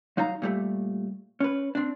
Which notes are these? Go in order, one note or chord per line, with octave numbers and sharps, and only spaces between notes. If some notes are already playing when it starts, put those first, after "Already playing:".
F#3 D#4 F5 A#5
A#2 G3 A3
C#4 B4
C4 D4